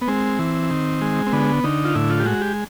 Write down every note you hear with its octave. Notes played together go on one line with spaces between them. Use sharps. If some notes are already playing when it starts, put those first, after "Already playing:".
B3
G#3 C4
E3
D#3
G#3
C4
D3 B3
D3 D#4
F4
A2 E4
F4
G4
G#3 F#4
G4